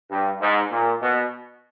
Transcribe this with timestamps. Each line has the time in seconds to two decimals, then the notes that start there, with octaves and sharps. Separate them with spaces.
0.10 G2
0.41 G#2
0.71 A#2
1.01 B2